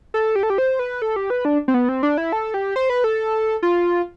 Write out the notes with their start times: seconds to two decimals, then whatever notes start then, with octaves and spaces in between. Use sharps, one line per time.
0.14 A4
0.36 G4
0.43 A4
0.50 G4
0.58 C5
0.79 B4
1.02 A4
1.16 G4
1.30 B4
1.45 D4
1.68 C4
1.74 B3
1.89 C4
2.03 D4
2.18 E4
2.32 A4
2.54 G4
2.76 C5
2.90 B4
3.04 A4
3.63 F4